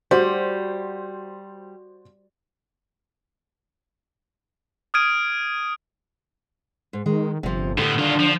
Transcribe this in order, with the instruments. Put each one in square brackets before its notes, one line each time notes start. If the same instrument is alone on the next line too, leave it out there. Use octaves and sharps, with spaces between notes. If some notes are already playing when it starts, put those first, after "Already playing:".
[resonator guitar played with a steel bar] G3 [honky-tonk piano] F#4 C5
[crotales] D#6 F6 G#6 D7 D#7
[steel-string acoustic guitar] G#2
[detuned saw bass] D#3 [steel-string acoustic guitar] G#3
[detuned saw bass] G1 [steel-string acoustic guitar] C3 F3
[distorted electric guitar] A2 B3 [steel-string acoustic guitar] D3 G4
[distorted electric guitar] D#3 F4 [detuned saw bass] D4
[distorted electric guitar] F3